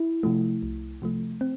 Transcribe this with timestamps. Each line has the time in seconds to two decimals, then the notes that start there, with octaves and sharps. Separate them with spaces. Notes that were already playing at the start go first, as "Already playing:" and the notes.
Already playing: E4
0.23 C3 F3 A3
0.63 C2
1.02 C3 F3 A3
1.41 C4